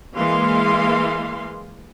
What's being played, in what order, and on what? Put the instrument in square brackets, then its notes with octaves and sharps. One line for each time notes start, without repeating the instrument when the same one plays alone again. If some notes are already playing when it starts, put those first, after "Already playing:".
[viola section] E3 G#3 A#3 F5 C6